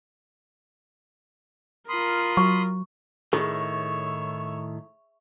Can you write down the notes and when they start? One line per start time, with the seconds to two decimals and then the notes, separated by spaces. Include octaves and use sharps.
1.89 F4 A#4 B5 C6 D#6
2.37 F#3 C#6
3.33 A2 D#3 G#4 C#5 E5